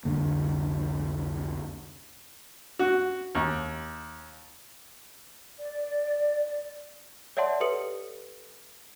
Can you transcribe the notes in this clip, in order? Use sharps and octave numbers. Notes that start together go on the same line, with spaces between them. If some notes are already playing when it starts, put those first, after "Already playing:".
C2 F2 D3 A#3
F#4
D#2
D5
C#5 D5 E5 F#5 A5 C6
G4 A4 B4 D#6 C#7 F#7